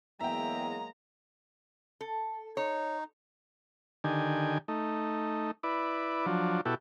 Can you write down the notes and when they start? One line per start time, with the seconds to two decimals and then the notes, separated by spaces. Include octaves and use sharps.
0.21 E2 F#3 G#3 A#3 E5 G5 A#5
2.01 A4
2.57 D#4 C#5
4.04 D3 D#3 G4 G#5
4.68 A3 D#4
5.63 E4 B4 D5
6.26 F3 F#3 D4
6.65 B2 E4 F#4 G4 A4